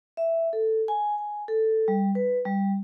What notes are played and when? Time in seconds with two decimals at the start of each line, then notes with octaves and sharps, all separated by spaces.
0.17 E5
0.53 A4
0.88 G#5
1.18 G#5
1.48 A4
1.88 G3
2.15 B4
2.45 G3